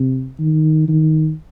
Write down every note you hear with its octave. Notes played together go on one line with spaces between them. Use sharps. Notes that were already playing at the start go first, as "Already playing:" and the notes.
Already playing: C3
D#3
D#3